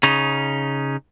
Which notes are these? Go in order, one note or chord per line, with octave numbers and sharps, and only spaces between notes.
C#3 C#4 D#4